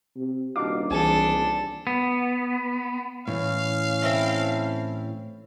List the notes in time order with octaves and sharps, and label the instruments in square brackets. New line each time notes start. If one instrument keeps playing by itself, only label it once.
[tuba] C3
[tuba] D#1 [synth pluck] D4 D6 [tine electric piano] D#4 F#4 F5
[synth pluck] C2 E3 [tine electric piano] C4 G#4 G#5 [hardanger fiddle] D4 A4
[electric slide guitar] B3
[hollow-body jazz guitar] A2 E3 [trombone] C#4 [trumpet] F5
[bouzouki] C4 E4 A4